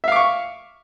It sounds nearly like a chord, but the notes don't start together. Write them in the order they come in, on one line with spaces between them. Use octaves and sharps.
E5 F5 D6 C#6